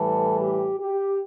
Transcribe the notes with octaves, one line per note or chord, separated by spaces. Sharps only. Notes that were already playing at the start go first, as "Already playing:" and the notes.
Already playing: A2 E3 G3 A4
G4
G4